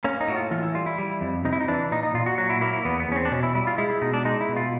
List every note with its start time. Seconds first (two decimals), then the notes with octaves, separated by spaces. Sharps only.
0.04 A#3 C#4
0.21 D#4
0.28 A2 F#4
0.36 F4
0.51 E3 F4
0.63 E4
0.75 G3 F4
0.86 E4
0.98 G3
1.21 F2
1.45 C3 D#4
1.53 E4
1.61 D#4
1.68 E3 D4
1.91 A#2 D#4
2.03 D#4
2.14 A#2 F4
2.26 F#4
2.38 F#3 F#4
2.50 E4
2.61 A#3 E4
2.73 E4
2.85 E2 B3
3.00 B3
3.08 E2 C#4
3.16 C4
3.25 D4
3.31 B2 C#4
3.43 E4
3.55 G3 E4
3.67 F4
3.78 G#3 E4
3.90 E4
4.01 B2 D#4
4.14 D4
4.25 G#3 D#4
4.41 E4
4.49 B2
4.56 F4